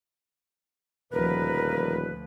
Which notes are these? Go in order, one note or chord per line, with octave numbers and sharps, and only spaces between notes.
D#1 D2 F3 A#4 B4